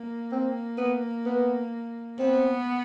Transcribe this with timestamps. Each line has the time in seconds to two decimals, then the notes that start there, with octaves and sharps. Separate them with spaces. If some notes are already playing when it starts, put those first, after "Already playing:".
Already playing: A#3
0.32 C4
0.78 B3
1.26 B3
2.19 B3 C4